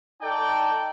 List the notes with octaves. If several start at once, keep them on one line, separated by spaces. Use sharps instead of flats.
D#4 A4 D5 G5